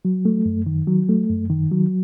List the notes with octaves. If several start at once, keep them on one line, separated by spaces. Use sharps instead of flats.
F#3
A3
F#2
D#3
F#3
A3
F#2
D#3
F#3